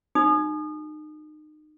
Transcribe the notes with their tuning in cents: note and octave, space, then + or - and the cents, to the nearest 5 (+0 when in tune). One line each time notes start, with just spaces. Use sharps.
D#4 -30 F#4 -30 D#6 -30